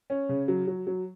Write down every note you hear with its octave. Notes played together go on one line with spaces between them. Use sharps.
C#4
C#3
F#3
F#3
F#3